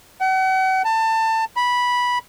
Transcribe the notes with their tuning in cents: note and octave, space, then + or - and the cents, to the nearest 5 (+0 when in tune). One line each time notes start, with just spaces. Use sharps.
F#5 +40
A5 +25
B5 -10